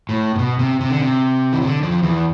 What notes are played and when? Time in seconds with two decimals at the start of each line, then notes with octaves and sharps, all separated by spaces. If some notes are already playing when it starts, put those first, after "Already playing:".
0.09 A2
0.36 A2
0.39 B2
0.59 C3
0.80 C3
0.90 D3
1.00 C3
1.53 E3
1.62 D3
1.83 F2 F3
2.03 E2 E3